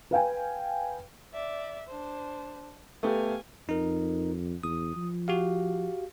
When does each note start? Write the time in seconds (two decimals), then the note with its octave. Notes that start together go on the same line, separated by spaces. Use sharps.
0.11 B4 F5 G5 G#5
1.33 D5 E5
1.87 D4 C5
3.03 A3 B3 G4 F5 G#5
3.69 F2 D#4 A#4
4.63 E2 D#6
4.96 F3
5.28 F#4 G4 F5